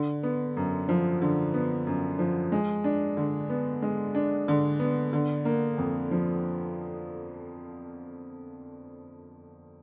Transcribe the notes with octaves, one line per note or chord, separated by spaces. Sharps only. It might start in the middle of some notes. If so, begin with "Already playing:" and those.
Already playing: D3
B3
F#2
F3
D3
B3
F#2
F3
G#3
D4
D3
B3
G#3
D4
D3
B3
D3
A#3
F2
F3